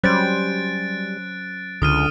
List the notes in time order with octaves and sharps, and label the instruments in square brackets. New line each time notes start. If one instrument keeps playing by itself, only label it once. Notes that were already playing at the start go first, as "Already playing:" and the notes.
[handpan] F#3 C#4 C5 [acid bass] G3 [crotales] F#6 A6 D7
[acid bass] C#2 [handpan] D3 [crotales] D#6 F6 D#7